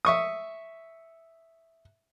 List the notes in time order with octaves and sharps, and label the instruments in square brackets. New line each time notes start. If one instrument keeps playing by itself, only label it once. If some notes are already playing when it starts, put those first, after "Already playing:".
[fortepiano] E5 C#6 D#6